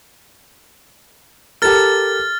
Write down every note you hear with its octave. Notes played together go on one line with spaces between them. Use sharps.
G4 A4 A#4 F6 A6